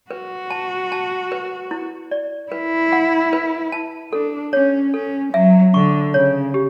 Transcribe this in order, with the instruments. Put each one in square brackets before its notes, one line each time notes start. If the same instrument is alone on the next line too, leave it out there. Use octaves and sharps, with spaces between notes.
[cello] F#4 [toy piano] B4
[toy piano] A5
A5
B4
E4
D5
[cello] E4 [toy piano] B4
[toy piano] F#5
B4
A5
[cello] D4 [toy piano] A4
[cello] C#4 [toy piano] C#5
[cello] C#4 [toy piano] A4
[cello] F#3 [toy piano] E5
[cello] D3 [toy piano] C#6
[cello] C#3 [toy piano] C#5
[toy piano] G4